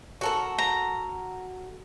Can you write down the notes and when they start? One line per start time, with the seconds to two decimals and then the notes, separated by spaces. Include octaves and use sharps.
0.21 F#4 A4 A#4
0.58 A#5